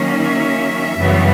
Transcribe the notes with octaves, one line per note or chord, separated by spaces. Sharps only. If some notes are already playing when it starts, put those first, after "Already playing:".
Already playing: D#3 F#3 A#3 C#4
E5
F#2 C#3 E3 G3 B3